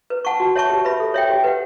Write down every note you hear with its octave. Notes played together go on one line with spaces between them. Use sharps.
B4
F#5 A5 C#6
F#4
C#5 E5 A5 C#6
G4
B4 E5 B5
A4
C#5 E5 G5
G4
B4 F#5